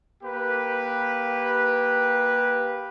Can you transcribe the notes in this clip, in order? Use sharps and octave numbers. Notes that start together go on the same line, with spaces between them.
A#3 G4 B4